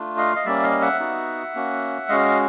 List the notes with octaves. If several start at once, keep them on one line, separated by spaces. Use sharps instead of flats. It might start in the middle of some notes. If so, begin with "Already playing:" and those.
Already playing: A3 D4 F4
D#5 F5
D#5
G3 A#3 C#4 D5 E5
D#5 F5
E5 F#5
B3 D#4 F#4
A#3 C#4 F#4
G#3 C#4 F#4 D#5 F5